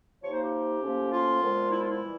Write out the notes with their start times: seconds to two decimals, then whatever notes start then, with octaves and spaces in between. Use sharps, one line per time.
0.22 C3 F3 A#3 D#4 C#5
0.32 C5
0.42 G4
0.81 A2 F3 A#3 C#4
1.11 F4
1.41 A#2 F3 G#3 B3
1.70 E4
1.80 F4
1.90 E4
2.02 E3 G3